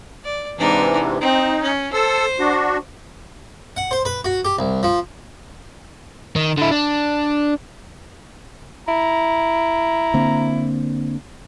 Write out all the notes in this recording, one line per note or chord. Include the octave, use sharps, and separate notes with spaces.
D5
G#2 C3 E3 D4 D#4
C4 D#4
C#4
A4 C5 E6
D4 F#4
F#5
C5
B4
F#4
G4
C2
F3
D#3
D3 E4
D4
E4 A#5
D3 A#3 C4